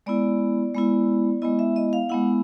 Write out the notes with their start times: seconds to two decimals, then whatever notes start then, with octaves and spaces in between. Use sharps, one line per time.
0.06 G#3 B3 E4 D5
0.74 G#3 B3 E4
1.42 G#3 B3 E4 D#5
1.59 E5
1.76 D#5
1.93 F5
2.09 G#3 B3 E4 F#5